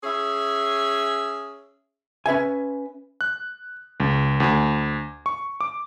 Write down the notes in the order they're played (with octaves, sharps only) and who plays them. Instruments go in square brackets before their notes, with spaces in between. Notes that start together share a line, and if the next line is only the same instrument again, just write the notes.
[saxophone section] C#4 G#4 E5
[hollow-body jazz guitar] C#4 B4 E5 G#5
[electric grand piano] F#6
C#2
D2
C#6
D6